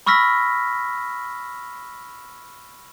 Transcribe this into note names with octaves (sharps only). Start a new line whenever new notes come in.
B5 C#6 E6 F6 A#6 B6